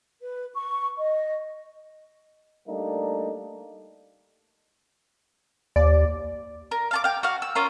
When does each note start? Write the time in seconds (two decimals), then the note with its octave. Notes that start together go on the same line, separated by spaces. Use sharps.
0.21 B4
0.54 C#6
0.98 D#5
2.68 G3 A3 A#3 D4 D#4
5.76 D#2 D5
6.71 A#4
6.91 F5 A5 D6
7.04 F5 G5
7.23 F#4 F5
7.42 E6
7.55 C#4 F4 A#4